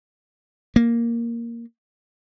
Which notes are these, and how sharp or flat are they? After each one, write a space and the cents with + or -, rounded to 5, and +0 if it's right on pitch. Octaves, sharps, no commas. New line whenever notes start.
A#3 +0